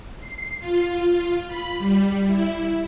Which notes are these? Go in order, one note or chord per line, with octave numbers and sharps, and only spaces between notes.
C7
F4
B5
G3
E4